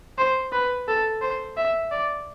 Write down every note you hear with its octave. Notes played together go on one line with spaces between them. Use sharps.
C5
B4
A4
C5
E5
D5